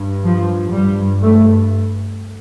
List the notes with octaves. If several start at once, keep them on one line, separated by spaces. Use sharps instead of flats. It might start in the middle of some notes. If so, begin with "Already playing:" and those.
Already playing: G2
F3
G2 G3
A3